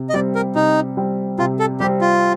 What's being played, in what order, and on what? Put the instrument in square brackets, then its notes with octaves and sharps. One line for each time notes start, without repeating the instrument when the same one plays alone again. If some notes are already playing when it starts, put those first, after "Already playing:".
Already playing: [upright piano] C3
[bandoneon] D#5
[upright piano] G3 C4 [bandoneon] D5
[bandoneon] A#4
[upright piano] C3 [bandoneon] D#4
[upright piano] G3 C4
[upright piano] C3 [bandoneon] F4
[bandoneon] A4
[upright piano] G3 C4 [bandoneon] G4
[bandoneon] F4